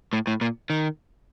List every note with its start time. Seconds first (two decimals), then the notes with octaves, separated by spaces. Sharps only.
0.13 A2
0.27 A2
0.41 A#2
0.70 D#3